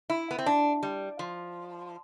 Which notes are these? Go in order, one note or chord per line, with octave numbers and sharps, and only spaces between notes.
E4
B3
C4
D4
G3
F3